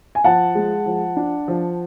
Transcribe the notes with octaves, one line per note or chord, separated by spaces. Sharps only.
G#5
F3 F#5 A5
G#3
F3
D4
F3